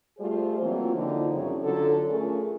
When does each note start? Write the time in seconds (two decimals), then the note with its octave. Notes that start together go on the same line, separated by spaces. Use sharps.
0.19 G3 A3 F4 G#4 C5
0.61 E3 F#3 A#3 C4 F4
0.95 D3 F3 A#3 D#4 E4
1.32 F#2 C#3 G3 C4 E4 C#5
1.63 D3 F#3 C#4 F4 A4
2.09 A3 C#4 F4 G#4 A#4